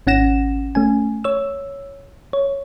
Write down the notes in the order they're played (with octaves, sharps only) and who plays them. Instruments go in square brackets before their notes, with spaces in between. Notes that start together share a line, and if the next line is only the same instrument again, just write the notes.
[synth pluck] G#1 C#4 F#5 A#6 E7
A3 C#4 G#5
C#5 E6
C#5